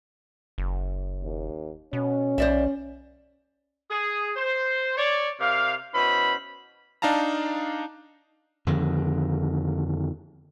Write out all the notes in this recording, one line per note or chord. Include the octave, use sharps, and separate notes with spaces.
F#1
D#2
B2 C#4
B1 C5 D5 E5
G#4
C5
C#5 D5
C3 A#4 D5 F5
B2 E3 C#4 C5 B5
D4 D#4 F5 A5 A#5
F2 D3 D#3